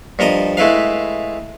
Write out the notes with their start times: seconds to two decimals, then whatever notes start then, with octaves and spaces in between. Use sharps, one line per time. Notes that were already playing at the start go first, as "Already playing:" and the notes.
0.19 G2 F3 A#4 D#5 D#6
0.57 G#3 A3 E4 B4 F5